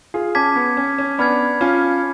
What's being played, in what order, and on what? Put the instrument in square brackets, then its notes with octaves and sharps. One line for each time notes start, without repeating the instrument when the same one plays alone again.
[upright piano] F4 G#4
[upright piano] C#4 [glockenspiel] A5 D6 G#6 B6
[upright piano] B3
C#4
C#4
[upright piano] B3 D4 [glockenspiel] B5 F6 G#6
[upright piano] C#4 F4